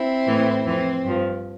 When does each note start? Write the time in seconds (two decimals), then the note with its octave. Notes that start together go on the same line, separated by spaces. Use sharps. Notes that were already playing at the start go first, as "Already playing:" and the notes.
Already playing: C4 E4
0.26 A2 E3
0.65 F2 E3 C4
1.04 G2 F3